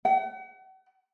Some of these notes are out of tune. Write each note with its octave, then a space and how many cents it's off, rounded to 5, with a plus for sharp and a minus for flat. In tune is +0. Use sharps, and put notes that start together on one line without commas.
F#5 +40